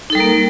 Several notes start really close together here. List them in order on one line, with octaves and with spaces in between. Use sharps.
D#4 A4 G3 A#4 A#3